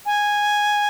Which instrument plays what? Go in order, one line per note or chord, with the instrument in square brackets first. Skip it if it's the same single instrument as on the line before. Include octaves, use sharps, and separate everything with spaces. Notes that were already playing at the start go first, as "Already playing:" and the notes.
[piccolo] G#5